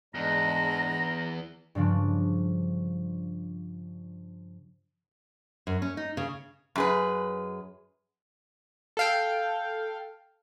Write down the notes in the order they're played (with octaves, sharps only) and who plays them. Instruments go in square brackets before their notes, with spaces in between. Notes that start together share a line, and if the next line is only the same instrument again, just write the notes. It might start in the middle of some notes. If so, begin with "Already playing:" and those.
[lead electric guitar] E2 [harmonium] G#2 G#3 D4 [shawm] A#5
[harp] G2 C#3 F3 D4
[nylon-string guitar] F#2
C#4
D#4
C#3
[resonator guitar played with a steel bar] F#2 G#4 B4
[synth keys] A4 F5 G5